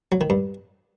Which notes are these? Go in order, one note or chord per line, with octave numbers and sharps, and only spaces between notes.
F#3
D#3
G2